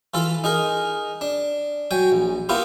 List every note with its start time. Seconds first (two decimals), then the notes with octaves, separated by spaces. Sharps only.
0.14 E3 F4 A4
0.44 D#4 G#4 A#4
1.21 D4
1.91 F#3 G5 G#5
2.12 A#1
2.49 A#3 B3 E4 F4 G4